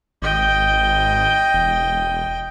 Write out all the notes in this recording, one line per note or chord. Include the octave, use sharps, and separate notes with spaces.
G#1 D#5 G5
E1